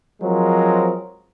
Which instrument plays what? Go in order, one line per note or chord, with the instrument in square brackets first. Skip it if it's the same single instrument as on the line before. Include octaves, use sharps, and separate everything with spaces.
[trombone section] F3 F#3 G#3 C4 A#4